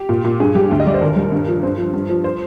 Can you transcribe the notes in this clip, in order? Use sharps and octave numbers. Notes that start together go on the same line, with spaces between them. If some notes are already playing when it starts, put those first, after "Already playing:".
Already playing: G4
A#2
A#2
G2 G#4
G3 G4
D2
D#5
G3 D5
C5
D#2 A#4
G3
G2
F3
G2 C5
F3
G2
F3
C5